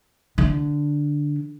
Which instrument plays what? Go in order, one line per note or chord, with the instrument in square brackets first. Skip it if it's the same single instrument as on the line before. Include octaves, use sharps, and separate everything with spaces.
[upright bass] D3